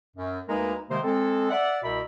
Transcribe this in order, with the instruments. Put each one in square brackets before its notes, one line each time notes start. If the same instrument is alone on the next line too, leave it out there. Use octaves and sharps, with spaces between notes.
[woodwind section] F#2
D2 G#3 A#3 D#4 A#4 B4
C3 D#3 G#3 A#3 C5
G#3 C4 A4
D5 E5 F#5
C2 B2 A#4 E5 B5